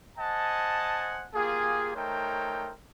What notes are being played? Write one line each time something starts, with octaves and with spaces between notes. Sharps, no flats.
C5 D#5 F#5 G#5 A5
A#3 F4 G4 G#4
A3 D#4 A#4 C5 C#5 G5